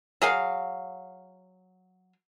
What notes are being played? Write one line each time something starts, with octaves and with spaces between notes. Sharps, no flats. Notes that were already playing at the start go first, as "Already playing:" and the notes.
F#3 G#4 F5